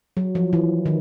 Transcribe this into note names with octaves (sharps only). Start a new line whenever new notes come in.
F#3
F3
E3
D#3